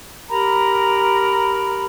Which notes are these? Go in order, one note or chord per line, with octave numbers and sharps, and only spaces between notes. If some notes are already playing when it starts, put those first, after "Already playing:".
G4 A#4 A#5 B5